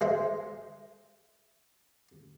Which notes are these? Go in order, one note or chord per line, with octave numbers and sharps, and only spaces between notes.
G#3 C5 E5